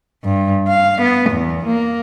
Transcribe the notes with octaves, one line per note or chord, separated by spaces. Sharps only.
G2
F5
B3
E2
A#3